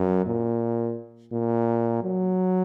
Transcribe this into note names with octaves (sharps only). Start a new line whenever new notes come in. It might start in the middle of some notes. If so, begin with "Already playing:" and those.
Already playing: F#2
A#2
A#2
F#3